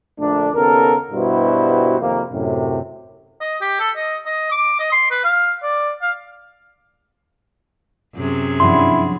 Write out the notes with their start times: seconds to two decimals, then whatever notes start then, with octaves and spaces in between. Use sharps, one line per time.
0.19 A#1 D3 A3 D4
0.55 D#2 C#3 B3 A4 A#4
1.12 G2 B2 G3 E4 F#4 C5
2.00 F2 C3 D#3 A#3
2.32 F#2 A2 C3
3.41 D#5
3.61 G4
3.80 A4
3.96 D#5
4.26 D#5
4.51 D6
4.79 D#5
4.92 C6
5.11 B4
5.24 F5
5.63 D5
6.02 F5
8.15 F#2 C3 G#4
8.60 G2 F3 F#3 E4 C6